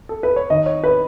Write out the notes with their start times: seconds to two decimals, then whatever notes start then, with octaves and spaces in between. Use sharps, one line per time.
0.09 A4
0.23 B4
0.36 C#5
0.50 D#3 D#5
0.66 C#5
0.84 B4